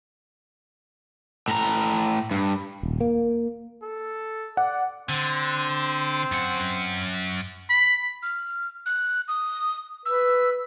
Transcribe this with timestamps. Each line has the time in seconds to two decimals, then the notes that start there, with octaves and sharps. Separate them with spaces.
1.48 A2 A#5
2.31 G2
2.83 D#1
3.00 A#3
3.83 A4
4.57 D5 F#5
5.09 D3 C4
6.32 F#2 F#5
7.70 B5
8.23 F6
8.86 F#6
9.28 D#6
10.06 B4 E6